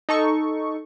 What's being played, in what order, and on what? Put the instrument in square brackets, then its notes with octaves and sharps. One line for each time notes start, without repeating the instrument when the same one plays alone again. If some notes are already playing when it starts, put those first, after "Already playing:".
[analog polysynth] D#4 A4 C#6